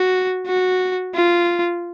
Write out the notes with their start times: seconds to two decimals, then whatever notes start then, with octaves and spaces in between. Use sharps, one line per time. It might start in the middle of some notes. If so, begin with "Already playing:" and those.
Already playing: F#4
0.47 F#4
1.15 F4